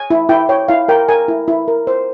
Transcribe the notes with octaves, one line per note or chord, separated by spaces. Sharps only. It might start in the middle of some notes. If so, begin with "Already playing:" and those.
Already playing: G#5
E4
E4 G5
C#5 G5
E4 F5
A#4 G5
A#4 G#5
E4
E4
A#4
C5